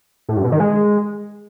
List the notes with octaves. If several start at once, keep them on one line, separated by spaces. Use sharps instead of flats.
A2
G2
B2
D#3
G#3